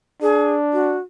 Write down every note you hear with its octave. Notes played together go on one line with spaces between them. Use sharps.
D4 G#4
F#4